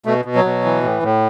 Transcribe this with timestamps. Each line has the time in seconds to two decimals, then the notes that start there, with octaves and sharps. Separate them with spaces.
0.05 B2 A3
0.25 B2
0.35 F#3
0.44 B2
0.64 E3
0.83 A2
1.03 A2